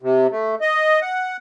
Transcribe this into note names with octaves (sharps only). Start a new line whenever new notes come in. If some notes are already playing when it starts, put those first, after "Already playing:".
C3
A3
D#5
F#5